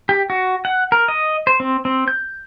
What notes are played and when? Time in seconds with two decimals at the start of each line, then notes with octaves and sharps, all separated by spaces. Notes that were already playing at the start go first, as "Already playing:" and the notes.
0.09 G4
0.30 F#4
0.65 F#5
0.92 A#4
1.08 D#5
1.47 C5
1.60 C4
1.85 C4
2.08 G6